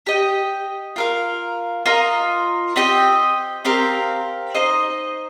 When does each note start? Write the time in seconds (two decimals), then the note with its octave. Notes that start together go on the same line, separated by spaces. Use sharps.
0.07 G4 D#5 G5
0.96 F4 A#4 F5
1.86 F4 A#4 D#5
2.76 C4 G4 D#5 G5
3.65 C4 G4 A#4 F5
4.55 D#4 C5 D#5